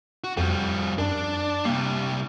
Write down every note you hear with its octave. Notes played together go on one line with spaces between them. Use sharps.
F#4
F2 F3 G3
F#2 D4
C3 G3 A#3